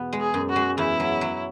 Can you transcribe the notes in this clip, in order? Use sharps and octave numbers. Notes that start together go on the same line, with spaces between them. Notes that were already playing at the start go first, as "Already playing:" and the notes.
Already playing: E2 B2 B3
G#3
G#4
F#2
F#4
G#3
E2 E4
F#3
F#3